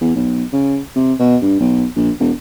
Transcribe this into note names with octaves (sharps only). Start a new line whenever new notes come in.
E2
B1
C#3
C3
B2
G2
B1
A#1
E1